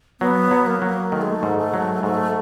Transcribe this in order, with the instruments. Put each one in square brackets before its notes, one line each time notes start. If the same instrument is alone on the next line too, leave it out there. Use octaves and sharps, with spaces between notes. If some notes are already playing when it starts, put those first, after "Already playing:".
[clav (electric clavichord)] F#3 [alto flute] B3
[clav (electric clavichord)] F#3
[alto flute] A#3
[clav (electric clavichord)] F#3
[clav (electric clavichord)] D#3 [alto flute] A3
[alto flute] G#3
A3
[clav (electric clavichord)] G#2
[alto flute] A3
[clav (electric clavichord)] F#3
[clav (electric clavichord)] G#2 [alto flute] A3